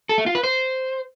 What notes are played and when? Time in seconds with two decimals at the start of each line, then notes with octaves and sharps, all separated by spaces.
0.09 A4
0.18 A3
0.26 F4
0.35 B4
0.43 C5